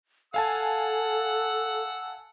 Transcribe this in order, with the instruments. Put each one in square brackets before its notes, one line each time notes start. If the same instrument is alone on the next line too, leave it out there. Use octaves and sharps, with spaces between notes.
[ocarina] A4 [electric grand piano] F5 G#5 A5 [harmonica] F#5 E6